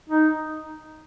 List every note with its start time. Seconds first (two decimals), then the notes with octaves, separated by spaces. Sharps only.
0.09 D#4